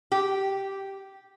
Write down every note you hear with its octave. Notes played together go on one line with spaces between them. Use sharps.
G4